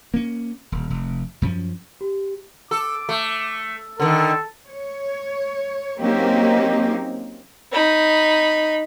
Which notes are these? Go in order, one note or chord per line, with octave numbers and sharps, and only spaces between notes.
A#3 C#4
D#1
F1
F#2 F3 C#4
G4
A4 D6
A3
D3 D#3 A4
C#5
F#3 A#3 C4 C#4 D#4 G4
D#4 B5